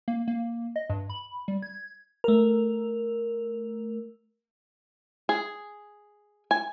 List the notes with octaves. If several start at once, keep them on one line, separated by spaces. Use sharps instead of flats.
A#3
A#3
D#5
G2
B5
G3
G#6
A3 A#4
G#4
G#5